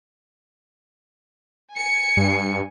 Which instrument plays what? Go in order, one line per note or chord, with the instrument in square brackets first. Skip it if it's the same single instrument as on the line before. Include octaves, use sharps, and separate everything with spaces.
[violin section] G#5 C#7
[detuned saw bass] G2